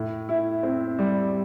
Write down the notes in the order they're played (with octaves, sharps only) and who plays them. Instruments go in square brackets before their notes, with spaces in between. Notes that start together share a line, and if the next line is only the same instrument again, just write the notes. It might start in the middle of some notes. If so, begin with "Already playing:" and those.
Already playing: [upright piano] A2
E4
C4
G3